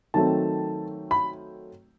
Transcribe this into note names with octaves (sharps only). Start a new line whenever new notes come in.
D#3 F#3 A3 C4 A5
B5